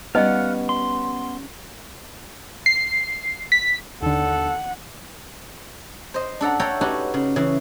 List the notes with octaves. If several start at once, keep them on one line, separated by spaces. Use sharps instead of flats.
G3 B3 C#4 D#4 D5 D#5 F5 F#5
C6
C7
B6
D#2 D3 A4 F#5
C5 D#5
D4 A4 F#5 A#5
A4 C#5 E5 F#5 G5 A#5
D#4 F#4 G4 B4 C#5 A5
C#3
C#3 E3